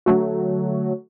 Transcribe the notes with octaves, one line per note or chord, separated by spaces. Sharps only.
D3 F#3 A3 F#4